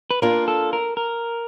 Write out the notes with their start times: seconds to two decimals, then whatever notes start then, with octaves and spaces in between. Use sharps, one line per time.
0.11 B4
0.22 A#3 D4 F4 A#4
0.48 A4
0.73 A#4
0.97 A#4